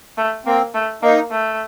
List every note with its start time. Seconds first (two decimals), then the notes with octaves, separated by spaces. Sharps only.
0.17 A3
0.45 A#3 C4
0.74 A3
1.02 A#3 D#4
1.31 A3